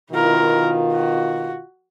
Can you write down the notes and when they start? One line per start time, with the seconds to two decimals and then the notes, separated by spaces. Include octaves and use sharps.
0.11 B2 D#3 E4 F4 A#4
0.93 F#4